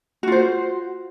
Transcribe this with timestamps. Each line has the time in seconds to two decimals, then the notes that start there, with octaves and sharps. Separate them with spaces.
0.23 F#4
0.27 F4
0.32 C5